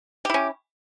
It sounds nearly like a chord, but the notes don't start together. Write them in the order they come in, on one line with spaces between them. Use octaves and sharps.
G4 E4 C#4